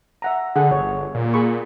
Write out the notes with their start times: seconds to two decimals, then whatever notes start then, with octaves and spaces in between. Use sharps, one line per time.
0.22 E5 F#5 A#5
0.56 D3 G#4 F#5
0.71 G1 C#5
1.15 A#2
1.34 G#4 B5 C#6